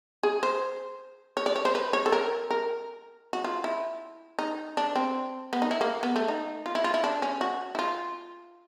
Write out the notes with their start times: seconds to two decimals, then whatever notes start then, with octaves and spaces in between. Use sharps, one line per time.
0.23 G#4
0.43 C5
1.37 C#5
1.46 D5
1.56 C#5
1.65 C5
1.75 B4
1.93 C#5
2.06 A4
2.12 A#4
2.50 A#4
3.33 F#4
3.44 F4
3.64 E4
4.39 D#4
4.77 D4
4.96 C4
5.53 B3
5.62 D#4
5.71 E4
5.81 A#3
6.03 B3
6.16 A3
6.28 D#4
6.66 F4
6.75 E4
6.84 F4
6.94 E4
7.04 D4
7.22 C#4
7.41 F#4
7.75 E4
7.79 F4